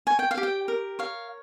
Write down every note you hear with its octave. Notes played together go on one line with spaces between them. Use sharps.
C#5 G#5
G5
F5
G4
G5
A#4
C#5 F5